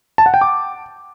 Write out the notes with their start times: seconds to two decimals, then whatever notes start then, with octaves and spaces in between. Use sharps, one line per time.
0.18 A5
0.26 F#5
0.34 G5
0.41 D6